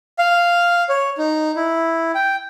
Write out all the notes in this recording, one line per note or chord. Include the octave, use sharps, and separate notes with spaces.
F5
C#5
D#4
E4
G5